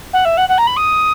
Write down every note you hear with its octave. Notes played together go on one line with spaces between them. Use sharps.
F#5
E5
F#5
F#5
A#5
B5
D#6